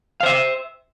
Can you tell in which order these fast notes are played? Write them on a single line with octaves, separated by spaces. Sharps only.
F5 C5 E5